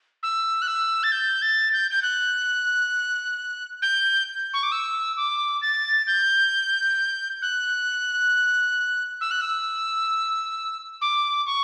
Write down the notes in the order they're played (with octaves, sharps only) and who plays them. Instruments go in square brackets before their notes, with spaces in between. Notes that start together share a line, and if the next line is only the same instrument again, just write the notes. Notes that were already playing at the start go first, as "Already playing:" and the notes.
[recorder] E6
F#6
E6
A6
G6
A6
G6
G6
F#6
G6
C#6
D6
E6
D6
A6
G6
F#6
E6
F#6
E6
D6
C#6